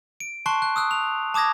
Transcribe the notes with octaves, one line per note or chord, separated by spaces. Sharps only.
D7
A5 C6 C#6 F#6 C7
F#6
D#6 E6 F#6
F7
A5 D6 D#6 G#6 A#6